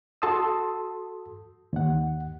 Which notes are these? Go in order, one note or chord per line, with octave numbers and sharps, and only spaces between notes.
F#4 A4 A5 C6 D#6 E6
D#2 F#5